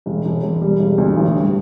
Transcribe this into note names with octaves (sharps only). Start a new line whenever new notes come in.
E1
E1
E1
G3
E1
D2
A1
G2